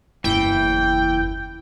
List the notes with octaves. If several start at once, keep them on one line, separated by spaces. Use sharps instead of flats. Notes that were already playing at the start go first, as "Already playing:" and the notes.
F#1 E2 E3 G5